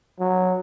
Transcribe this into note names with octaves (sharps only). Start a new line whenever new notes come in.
F#3